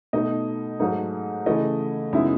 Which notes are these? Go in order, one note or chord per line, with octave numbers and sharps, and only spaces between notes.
B2 A3 D#4 D#5
G#2 F#3 A3 D#4
C#3 E3 A3 E4 D#5
F#2 C#3 G#3 B3 D#4 E4 E5